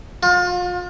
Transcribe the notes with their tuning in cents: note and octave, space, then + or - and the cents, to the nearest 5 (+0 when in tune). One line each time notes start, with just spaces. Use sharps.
F4 +35